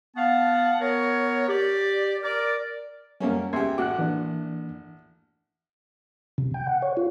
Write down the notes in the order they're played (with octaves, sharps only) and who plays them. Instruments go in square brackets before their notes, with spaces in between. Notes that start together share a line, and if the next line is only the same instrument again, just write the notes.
[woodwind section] B3 F5 F#5 A5
B3 A#4 C#5
G4 D5
A#4 D5
[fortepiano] F#2 A#3 C#4 [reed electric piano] G3
[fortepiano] C#2 G4 [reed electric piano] E5 C6 G#6
[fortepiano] A1 F#4 [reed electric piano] D6 F#6
[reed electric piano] E3 A#3 D4
[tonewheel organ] C3
G5
F#5
C#5
F4